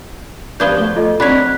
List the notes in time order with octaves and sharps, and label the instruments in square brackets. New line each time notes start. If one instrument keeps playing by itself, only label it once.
[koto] F3 B3 D4 [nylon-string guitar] F#4 G4 [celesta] G6 G#6 G7
[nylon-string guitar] D2 A3 D5 [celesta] G7
[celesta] F4 A4 D#5
[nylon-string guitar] C4 D#4 F#4 [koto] D4 C#5 [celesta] B5 F#6 B6